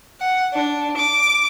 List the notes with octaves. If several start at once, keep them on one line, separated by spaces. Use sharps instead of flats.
F#5
D4
D6